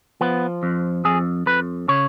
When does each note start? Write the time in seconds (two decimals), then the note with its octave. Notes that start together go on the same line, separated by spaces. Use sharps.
0.21 F3 B3
0.63 F2
1.05 F2 G#4
1.46 F2 B4
1.88 C#3 C#5